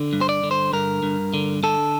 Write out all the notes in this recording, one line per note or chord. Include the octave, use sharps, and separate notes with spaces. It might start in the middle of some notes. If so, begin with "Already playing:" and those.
Already playing: D3
G2
C5
D5
D3
C5
G2 A#4
G2
D3
D3 A4